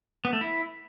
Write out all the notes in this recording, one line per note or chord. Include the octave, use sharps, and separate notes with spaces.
B3
A3
E4